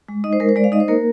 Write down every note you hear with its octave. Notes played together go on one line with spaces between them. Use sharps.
G#3
D#4 D#5
C5
G#3 A#4
C5
G#3 D5
F5
D#4 D#5
C5
A#3 A#4